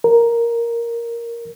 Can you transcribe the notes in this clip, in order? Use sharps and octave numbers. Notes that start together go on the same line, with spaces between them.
A#4